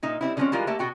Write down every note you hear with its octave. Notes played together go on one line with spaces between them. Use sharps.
A#2 D#4 E5
G3 C4 E4
D3 F3 G#3 A3 C4 C#4
E3 G3 G#3 F4 A#4
A3 A#3 G4 E5
B2 F#4 G5